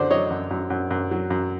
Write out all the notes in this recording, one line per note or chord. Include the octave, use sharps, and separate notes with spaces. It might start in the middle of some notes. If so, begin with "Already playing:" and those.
Already playing: F#2 D3 C5 D5
F#3 C#5 D#5
F#2
F#2
F#2
F#2
F#3
F#2